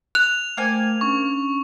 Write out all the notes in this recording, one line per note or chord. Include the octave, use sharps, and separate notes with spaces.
F#6 F7
A3 A#3 C5 G5 G#5
C#4 D4 C#6